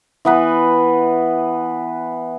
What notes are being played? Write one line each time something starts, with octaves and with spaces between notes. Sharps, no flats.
E3 B3 B4